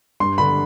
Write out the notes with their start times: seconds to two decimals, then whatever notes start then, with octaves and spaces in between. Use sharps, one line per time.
0.20 G2 C6
0.38 D3 B5